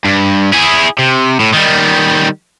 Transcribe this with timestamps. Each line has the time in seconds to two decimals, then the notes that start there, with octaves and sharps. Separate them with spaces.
0.05 G2
0.53 E4 G#4
0.98 C3
1.40 A2
1.54 D#3 G3